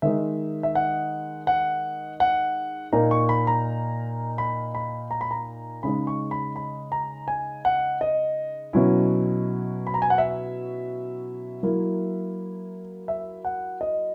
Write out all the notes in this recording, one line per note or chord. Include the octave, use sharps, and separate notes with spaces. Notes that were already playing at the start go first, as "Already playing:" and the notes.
D#3 G#3 D#4 E5
E5
F#5
F#5
F#5
A#2 A#3 D#4 A#5
C#6
B5
A#5
B5
B5
A#5
B5
A#5
C#3 G#3 D#4 B5
C#6
B5
B5
A#5
G#5
F#5
D#5
B2 F#3 C#4 E4
B5
A#5
G#5
F#5
E5
F#3 A#3 E4
E5
F#5
D#5